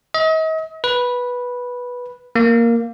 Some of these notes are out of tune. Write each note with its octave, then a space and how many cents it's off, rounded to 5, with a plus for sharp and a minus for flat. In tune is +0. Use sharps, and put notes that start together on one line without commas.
D#5 +40
B4 -10
A#3 +0